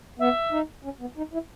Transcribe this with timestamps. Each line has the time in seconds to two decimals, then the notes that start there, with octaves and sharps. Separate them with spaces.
0.19 B3 E5
0.52 D#4
0.84 C#4
1.01 B3
1.17 D#4
1.33 E4